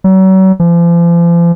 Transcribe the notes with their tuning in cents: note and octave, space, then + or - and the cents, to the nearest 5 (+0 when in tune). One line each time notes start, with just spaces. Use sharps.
F#3 +40
F3 -40